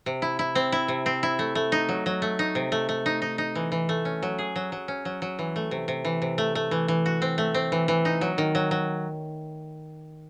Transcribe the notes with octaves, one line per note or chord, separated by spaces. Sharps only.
C3
E4
E4
C4
E4
C3
C4
E4
A3
A3
D#4
F#3
F#3
A3
D#4
C3
A3
A3
D#4
D#4
D#4
E3
E3
A3
C#4
F#3
G#4
F#3
F#3
C#4
F#3
F#3
E3
A3
C3
C3
E3
C3
A3
A3
E3
E3
F#4
C4
A3
C4
E3
E3
D#4
F#3
D#3
F#3
F#3